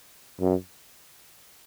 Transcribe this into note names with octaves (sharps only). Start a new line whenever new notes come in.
F#2